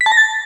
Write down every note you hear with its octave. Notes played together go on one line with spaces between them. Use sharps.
B6
A5
A#6
A6